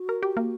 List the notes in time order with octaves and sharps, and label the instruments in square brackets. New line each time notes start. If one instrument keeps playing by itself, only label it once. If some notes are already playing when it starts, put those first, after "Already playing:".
Already playing: [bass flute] F#4
[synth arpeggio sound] A#4
G4
A#3